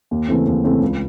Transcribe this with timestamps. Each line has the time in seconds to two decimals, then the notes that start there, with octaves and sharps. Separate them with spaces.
0.11 D#2
0.28 C#3 E3 A3 C4
0.46 D#2
0.64 C#3 E3 A3 C4
0.82 C#2